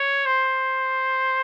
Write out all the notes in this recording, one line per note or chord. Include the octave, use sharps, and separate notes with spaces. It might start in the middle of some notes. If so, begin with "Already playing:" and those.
Already playing: C#5
C5